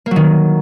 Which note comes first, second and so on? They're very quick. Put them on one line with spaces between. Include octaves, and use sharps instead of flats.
A#3 F#3 D#3